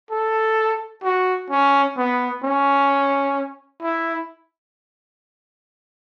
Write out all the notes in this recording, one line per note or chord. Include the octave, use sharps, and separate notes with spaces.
A4
F#4
C#4
B3
C#4
E4